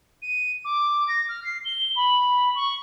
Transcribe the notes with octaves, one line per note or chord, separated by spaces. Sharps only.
D#7
D6
A#6
F6
C7
G7
B5
C#6